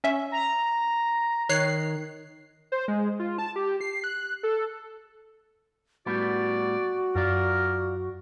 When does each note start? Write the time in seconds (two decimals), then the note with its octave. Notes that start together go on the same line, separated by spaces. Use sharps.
0.04 C#4 E5
0.32 A#5
1.49 D#3 C#5 F#6 C7
2.72 C5
2.88 G#3
3.19 F4
3.38 A5
3.56 G4
3.81 C7
4.04 F#6
4.43 A4
6.06 A2 G3 B3 F#4 D5
7.16 F#2 F4 A#4 D5